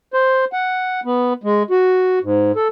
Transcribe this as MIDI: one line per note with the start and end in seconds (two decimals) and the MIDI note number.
0.14 0.45 72
0.53 1.00 78
1.05 1.33 59
1.44 1.63 56
1.71 2.19 66
2.23 2.52 44
2.56 2.68 69